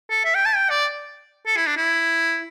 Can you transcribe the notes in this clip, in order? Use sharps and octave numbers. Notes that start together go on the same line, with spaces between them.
A4
E5
G5
A5
G5
D5
A4
E4
D4
E4